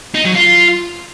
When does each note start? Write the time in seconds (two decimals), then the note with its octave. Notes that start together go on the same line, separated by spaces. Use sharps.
0.15 D#4
0.25 F#3
0.36 F4